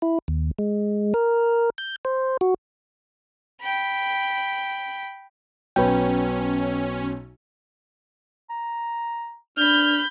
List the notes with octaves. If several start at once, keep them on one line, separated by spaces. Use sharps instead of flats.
E4
D#2
G#3
A#4
G6
C5
F#4
G5 B5
B1 B2 F#3 C#4 B4 G5
A#5
D4 B5 F6 G6